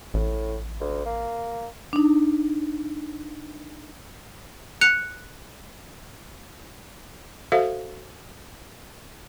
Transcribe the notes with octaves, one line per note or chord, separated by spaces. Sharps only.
A1 A2
D2
A#3
D4 D#4
F#6 C#7 F7
F#4 A4 C5 E5 F5